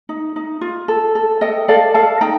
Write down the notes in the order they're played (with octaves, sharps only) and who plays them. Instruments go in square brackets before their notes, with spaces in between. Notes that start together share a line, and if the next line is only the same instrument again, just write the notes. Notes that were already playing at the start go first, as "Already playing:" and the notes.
[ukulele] D#4
D#4
F4
A4
A4
A4 D#5 G5
A4 D5 F5
A4 F5 A5
D#4 G5 A#5